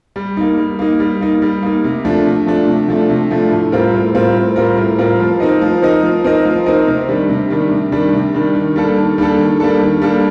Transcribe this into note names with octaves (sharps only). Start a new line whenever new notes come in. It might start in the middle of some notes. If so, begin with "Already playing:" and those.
G3
A#3 D#4
G3
A#3 D#4
G3
A#3 D#4
G3
A#3 D#4
C3
F3 A3 D4
C3
F3 A3 D4
C3
F3 A3 D4
C3
F3 A3 D4
A2
G3 C4 F4 A#4
A2
G3 C4 F4 A#4
A2
G3 C4 F4 A#4
A2
G3 C4 F4 A#4
F3
C4 D#4 A#4 D#5
F3
C4 D#4 A#4 D#5
F3
C4 D#4 A#4 D#5
F3
C4 D#4 A#4 D#5
C3
D#3 G3 D4
C3
D#3 G3 D4
C3
D#3 G3 D4
C3
D#3 G3 D4
D#3
G3 A#3 D4 A4
D#3
G3 A#3 D4 A4
D#3
G3 A#3 D4 A4
D#3
G3 A#3 D4 A4